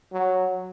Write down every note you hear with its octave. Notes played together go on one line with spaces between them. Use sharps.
F#3